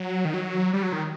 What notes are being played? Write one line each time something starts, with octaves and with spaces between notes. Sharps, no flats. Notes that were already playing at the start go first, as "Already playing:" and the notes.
Already playing: F#3
D#3
F#3
G3
F#3
D#3